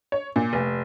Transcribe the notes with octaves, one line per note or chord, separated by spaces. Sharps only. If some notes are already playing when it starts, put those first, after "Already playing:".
C#5
A#2
F1